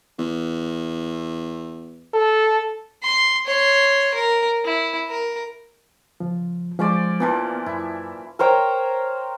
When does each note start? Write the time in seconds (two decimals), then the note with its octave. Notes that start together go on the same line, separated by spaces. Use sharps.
0.18 E2
2.14 A4
3.03 C6
3.46 C#5 C6
4.15 A#4
4.65 E4
5.10 A#4
6.20 C#2 F3
6.79 F3 G#3 C#4 C5 D5
7.20 A#2 E3 F3 B3
7.66 F#2 E4
8.39 A#4 C5 C#5 G5